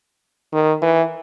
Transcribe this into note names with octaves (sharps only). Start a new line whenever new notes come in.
D#3
E3